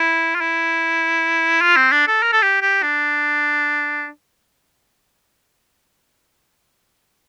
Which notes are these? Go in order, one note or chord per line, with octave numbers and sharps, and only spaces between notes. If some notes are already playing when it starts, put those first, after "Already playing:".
Already playing: E4
F4
E4
F4
C4
D4
A4
A#4
A4
G4
G4
D4